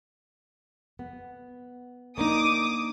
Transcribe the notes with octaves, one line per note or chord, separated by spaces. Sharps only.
B3
A#3 D4 D#4 D6 D#6